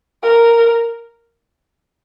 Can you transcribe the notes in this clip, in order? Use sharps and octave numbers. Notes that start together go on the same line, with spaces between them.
A#4